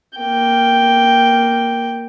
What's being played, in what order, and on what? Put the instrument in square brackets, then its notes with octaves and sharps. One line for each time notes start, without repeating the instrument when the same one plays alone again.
[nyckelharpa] A#3 G5